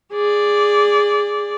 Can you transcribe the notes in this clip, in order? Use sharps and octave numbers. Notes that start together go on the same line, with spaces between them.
G#4 D5